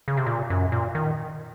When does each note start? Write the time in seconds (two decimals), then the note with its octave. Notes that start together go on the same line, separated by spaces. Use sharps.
0.08 C#3
0.17 C3
0.26 A#2
0.50 F#2
0.72 A#2
0.95 D#3